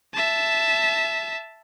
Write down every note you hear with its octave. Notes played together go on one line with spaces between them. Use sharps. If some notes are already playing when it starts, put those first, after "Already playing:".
E5 A5